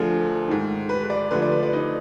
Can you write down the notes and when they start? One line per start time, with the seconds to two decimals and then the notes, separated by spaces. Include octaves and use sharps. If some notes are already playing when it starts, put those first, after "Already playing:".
Already playing: D2 D3 F3 G#4
0.48 G#2 D#3
0.89 B4
1.03 B4
1.10 D5
1.31 D2 D3 F3 B4
1.42 D5
1.52 B4
1.63 D5
1.73 D#4